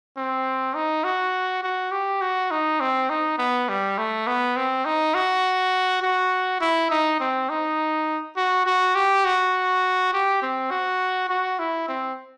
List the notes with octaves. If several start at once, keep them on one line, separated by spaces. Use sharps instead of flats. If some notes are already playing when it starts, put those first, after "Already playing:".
C4
D#4
F#4
F#4
G4
F#4
D#4
C4
D#4
B3
G3
A3
B3
C4
D#4
F#4
F#4
E4
D#4
C4
D#4
F#4
F#4
G4
F#4
G4
C4
F#4
F#4
E4
C4